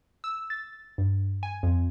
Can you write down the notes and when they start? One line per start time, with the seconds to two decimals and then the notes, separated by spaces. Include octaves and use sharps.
0.24 E6
0.50 A6
0.98 G2
1.43 G#5
1.63 F2